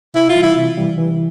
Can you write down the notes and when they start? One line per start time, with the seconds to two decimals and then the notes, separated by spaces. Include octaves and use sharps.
0.14 C3 E4
0.29 F4
0.35 E3 G3
0.43 E4
0.56 C3
0.78 E3 G3
0.98 E3